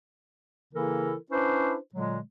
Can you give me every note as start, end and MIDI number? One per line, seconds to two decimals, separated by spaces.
0.74 1.15 49
0.74 1.15 52
0.74 1.15 58
0.74 1.15 64
0.74 1.15 69
0.74 1.15 70
1.31 1.76 61
1.31 1.76 62
1.31 1.76 64
1.31 1.76 71
1.31 1.76 72
1.95 2.20 46
1.95 2.20 50
1.95 2.20 54
1.95 2.20 56